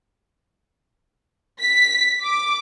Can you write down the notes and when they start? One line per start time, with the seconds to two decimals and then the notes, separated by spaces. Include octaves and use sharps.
1.61 B6
2.23 D6